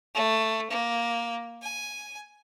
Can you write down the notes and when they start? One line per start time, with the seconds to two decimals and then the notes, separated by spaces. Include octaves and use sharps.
0.15 A3
0.71 A#3
1.62 G#5